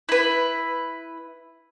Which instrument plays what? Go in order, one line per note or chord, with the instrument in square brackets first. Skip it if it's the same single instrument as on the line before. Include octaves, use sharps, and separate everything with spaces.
[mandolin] E4 B4